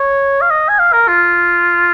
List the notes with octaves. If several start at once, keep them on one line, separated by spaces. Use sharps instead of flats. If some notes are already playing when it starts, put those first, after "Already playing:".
Already playing: C#5
F5
D#5
G#5
F5
A#4
F4